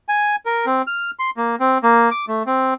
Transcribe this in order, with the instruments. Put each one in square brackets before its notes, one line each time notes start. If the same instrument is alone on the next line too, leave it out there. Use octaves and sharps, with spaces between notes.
[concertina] G#5
A#4
C4
F6
C6
A#3
C4
A#3
D6
A3
C4